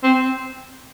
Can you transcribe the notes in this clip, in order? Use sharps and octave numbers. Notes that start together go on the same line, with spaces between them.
C4